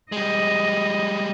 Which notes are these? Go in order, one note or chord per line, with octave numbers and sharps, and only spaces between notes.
G3 G#3 D#5